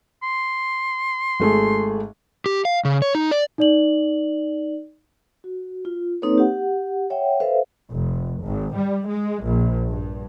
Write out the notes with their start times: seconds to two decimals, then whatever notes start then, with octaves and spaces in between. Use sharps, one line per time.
0.23 C6
1.40 G#1 A3 G#4
2.46 G4
2.65 F5
2.85 C#3
3.02 C#5
3.15 D#4
3.31 D5
3.58 D#4 D5 F#7
5.44 F#4
5.85 F4
6.22 A#3 C4 D#4 A4 B4 C#5
6.38 G4 F#5
7.10 C#5 E5 F#5 G5
7.40 A4 B4 C5 E5 F5
7.92 F1
8.44 G#1
8.76 G3
9.08 G#3
9.46 A#1
9.90 G2